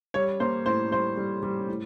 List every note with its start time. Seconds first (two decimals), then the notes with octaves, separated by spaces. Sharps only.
0.14 G3 C#5
0.40 A#3 C5
0.66 A2 C5
0.91 G3 C5
1.17 G3
1.43 G3
1.69 A2